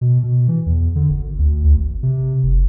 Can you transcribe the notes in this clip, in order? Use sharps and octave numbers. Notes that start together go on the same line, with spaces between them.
B2
B2
E3
E2
D3
G#1
D2
D2
G#1
C3
F#1